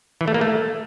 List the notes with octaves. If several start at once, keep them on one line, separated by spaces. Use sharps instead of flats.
E3
A3
A#3
A3